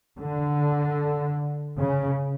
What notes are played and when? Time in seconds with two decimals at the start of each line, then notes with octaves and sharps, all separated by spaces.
0.18 D3
1.78 C#3